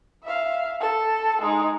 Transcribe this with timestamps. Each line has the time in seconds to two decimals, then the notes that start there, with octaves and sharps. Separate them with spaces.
0.24 E5 F5
0.80 A4
1.42 G#3 D#4